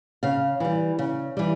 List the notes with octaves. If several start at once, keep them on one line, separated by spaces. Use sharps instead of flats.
C#3 F5
E3 G3
C#3
E3 G3